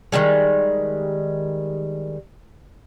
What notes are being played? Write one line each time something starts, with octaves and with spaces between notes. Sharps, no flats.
D#3 F3 G3 G#3